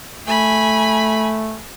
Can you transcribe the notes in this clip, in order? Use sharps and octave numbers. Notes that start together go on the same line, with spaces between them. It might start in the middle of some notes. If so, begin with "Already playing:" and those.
A3 G#5 B5